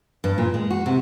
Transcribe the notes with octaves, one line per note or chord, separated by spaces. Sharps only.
G2
A#2
G#3
F#4
C3